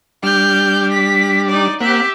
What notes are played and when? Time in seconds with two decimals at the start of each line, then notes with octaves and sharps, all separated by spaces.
0.23 G3 D4 F6 G6
0.92 B6
1.48 D#4 D5
1.81 A#3 C4 G4 E5 F#5